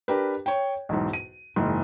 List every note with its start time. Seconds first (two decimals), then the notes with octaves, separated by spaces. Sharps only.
0.08 D4 G4 A#4 B4
0.46 C#5 G5
0.89 B1 E2 G#2
1.13 D#7
1.56 F#1 G#2 E3